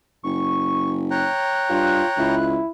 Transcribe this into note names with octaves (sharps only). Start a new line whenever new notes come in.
F#1 C#6
C#5 G5 A#5 F#6
G2 F4
C#2 E4